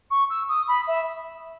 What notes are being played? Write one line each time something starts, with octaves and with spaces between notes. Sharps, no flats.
C#6
E6
D#6
B5
E5